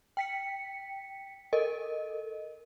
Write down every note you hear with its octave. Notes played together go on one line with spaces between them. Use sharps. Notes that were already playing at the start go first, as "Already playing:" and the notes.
G5 B6 C#7
A4 A#4 D#5